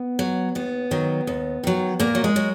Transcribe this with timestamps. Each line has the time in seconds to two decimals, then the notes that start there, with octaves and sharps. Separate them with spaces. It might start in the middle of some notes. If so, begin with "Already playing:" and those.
Already playing: B3
0.19 F#3
0.55 D#2 B3
0.91 D#3 F#3
1.27 D#2
1.64 D#3 F#3
2.00 A#2 A#3
2.15 F#3
2.24 G#3
2.36 F#3